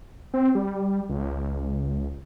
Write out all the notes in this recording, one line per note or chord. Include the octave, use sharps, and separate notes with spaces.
C4
G3
C#2